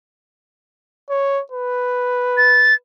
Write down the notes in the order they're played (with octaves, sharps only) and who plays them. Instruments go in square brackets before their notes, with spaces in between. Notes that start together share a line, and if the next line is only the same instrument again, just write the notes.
[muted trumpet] C#5
B4
[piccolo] A6